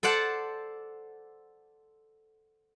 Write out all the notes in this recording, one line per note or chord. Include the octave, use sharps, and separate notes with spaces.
A4 C5 D5 F#5 A5